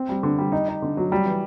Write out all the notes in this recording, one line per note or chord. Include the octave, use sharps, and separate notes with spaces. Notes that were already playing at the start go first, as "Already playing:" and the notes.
Already playing: C4
G3
D3
G3
D#4
D#4
D3
F#3
G3
E3